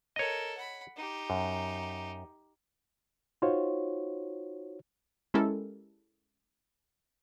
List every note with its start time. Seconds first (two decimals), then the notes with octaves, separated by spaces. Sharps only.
0.16 A4 A#4 C#5 D#5
0.57 F#5 B5
0.96 D#4 G4
1.30 F#2
3.42 D#4 F4 F#4 C5 C#5
5.34 G#3 C#4 E4 G4 A4 A#4